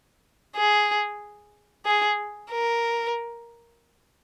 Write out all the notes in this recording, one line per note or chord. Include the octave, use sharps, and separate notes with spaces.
G#4
G#4
A#4